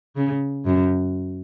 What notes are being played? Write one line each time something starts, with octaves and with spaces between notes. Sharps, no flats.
C#3
F#2